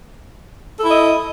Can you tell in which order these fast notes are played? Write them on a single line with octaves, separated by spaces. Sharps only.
A4 E4 D#5